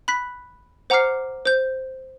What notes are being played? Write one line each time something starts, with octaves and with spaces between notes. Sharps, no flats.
B5 F#6 B6
C5 F#5 A#5 D6 F6 C7
C5 G6